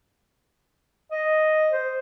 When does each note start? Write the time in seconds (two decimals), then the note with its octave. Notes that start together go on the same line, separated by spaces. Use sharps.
1.11 D#5
1.72 C5